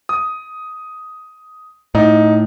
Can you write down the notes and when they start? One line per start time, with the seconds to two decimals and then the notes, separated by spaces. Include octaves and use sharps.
0.09 D#6
1.95 A2 D#4